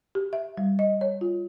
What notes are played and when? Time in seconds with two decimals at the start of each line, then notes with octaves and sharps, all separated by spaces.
0.15 G4
0.33 E5
0.57 G3
0.79 D#5
1.01 C#5
1.21 F4